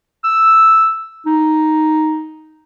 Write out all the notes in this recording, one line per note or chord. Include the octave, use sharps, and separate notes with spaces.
E6
D#4